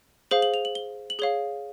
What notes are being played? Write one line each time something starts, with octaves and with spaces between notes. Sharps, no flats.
G#4 C5 F5 F#7
F#7
F7
F#7
G7
F#7
G#4 C#5 F5 G7